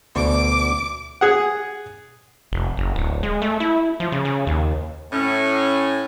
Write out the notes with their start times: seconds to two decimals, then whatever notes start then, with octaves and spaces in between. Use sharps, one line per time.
0.16 D2 B2 D3 D6
1.21 G#4 F#5
2.52 F1
2.77 F#1
2.96 D1
3.23 G#3
3.42 A3
3.60 E4
4.00 F3
4.12 C#3
4.25 C#3
4.47 D#2
5.12 A2 C#4